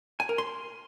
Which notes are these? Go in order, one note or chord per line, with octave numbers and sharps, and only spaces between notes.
G#5
A#4
C6